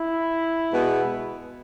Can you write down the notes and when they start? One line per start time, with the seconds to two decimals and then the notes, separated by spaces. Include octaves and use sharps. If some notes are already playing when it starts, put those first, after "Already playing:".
Already playing: E4
0.72 B2 G#3 B3